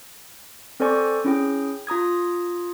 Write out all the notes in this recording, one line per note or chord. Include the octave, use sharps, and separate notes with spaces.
C4 A4 C5 D5 G#5 C#6
C#4 E4 G#4 G5
F4 A#5 D#6 G#6